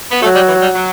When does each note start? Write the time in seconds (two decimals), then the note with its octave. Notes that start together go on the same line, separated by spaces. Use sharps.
0.11 B3
0.22 F#3 A3
0.35 G3
0.48 E3
0.62 G3
0.75 F#3